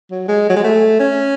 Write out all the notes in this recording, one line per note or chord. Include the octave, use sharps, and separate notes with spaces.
F#3
G#3
F#3
G#3
A3
C#4